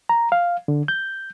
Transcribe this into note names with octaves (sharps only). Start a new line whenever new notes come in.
A#5
F5
D3
G6